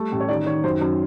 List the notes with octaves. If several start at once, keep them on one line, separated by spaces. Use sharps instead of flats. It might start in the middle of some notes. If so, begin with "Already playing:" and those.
Already playing: G3 A3
A1
C#5
D#3 D5
D#3 C#5
F#2 C5
F#2